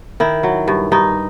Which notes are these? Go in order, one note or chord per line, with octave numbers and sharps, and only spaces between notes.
D#3 E4
F#3
G2
G2 D#4